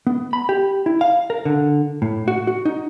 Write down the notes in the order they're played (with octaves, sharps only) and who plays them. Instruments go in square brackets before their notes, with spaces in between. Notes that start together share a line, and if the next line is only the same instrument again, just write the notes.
[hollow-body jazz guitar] B3
B5
G4
E4
F5
A#4
D3
A2
F#4
F#4
D#4